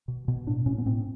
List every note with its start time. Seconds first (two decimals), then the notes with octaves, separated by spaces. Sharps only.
0.08 B2
0.28 B2
0.47 A2 D4
0.66 A2 C#4
0.78 B3
0.86 A2 C4